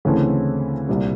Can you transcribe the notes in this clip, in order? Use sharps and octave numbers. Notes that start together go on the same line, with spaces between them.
D2 C#3 E3 A3 C4
C2 A#2 G3 C4